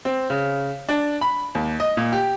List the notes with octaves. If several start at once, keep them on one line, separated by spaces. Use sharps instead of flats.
C4
C#3
D4
B5
D#2
D#5
A#2
G4